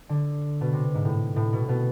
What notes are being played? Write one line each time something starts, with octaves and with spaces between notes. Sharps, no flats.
D3
B2
C3
G#2
A2
A2
B2
B2